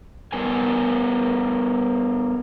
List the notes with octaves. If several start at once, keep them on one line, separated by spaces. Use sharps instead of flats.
G3 B3 A#4 B4 G#5